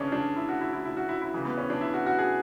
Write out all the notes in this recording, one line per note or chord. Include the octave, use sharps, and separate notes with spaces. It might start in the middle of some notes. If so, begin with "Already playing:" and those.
Already playing: C#3 E3 C#4 D4
D4
E4
F#4
E4
E4
E4
F#4
E4
E4
C#3 E3
B3
C#4
D4
E4
F#4
F#4
G#4